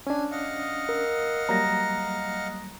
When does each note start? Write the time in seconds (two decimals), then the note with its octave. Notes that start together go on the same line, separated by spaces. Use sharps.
0.07 C#4 D4 G#5
0.31 D#5 F5 F#5
0.89 A#4
1.49 F#3 G3 A#3 A#5 A#6